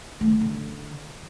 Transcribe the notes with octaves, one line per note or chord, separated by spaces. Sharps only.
A3
D#3
F#3
D3